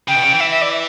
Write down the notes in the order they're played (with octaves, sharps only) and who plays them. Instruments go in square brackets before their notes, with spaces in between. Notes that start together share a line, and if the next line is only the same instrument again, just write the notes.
[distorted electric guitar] C#3 [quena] G5
[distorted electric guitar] B2
C#3
E3
[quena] E5
E5
D5
E5